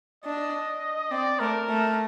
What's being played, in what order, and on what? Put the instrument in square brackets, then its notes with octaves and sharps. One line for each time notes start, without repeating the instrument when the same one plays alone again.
[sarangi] D4 [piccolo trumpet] D#5
[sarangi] C4 [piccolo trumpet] D5
[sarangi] A3 [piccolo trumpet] A#4
[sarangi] A3